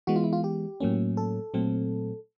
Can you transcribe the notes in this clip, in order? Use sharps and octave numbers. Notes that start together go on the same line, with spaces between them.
E3 G#3 B3 F#4
F4
E4
F4
G4
A2 F#3 A#3 C#4
A4
A#2 F#3 A3 C4